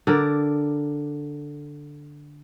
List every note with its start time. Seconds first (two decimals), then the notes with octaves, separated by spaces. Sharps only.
0.07 D3 A#4 D5